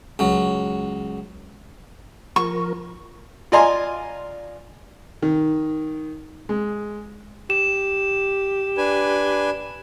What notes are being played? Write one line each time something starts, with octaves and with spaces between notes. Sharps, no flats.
C#2 F#3
F3 A#4 C#6
F4 D5 D#5 G#5 A#5 C6
D#3
G#3
G4 E7
D4 B4 G#5